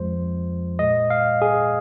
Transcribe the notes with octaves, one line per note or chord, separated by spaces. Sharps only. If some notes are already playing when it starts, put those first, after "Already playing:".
Already playing: F2 F3 G#3 C5
A#2 G#3 D#5
F5
G#4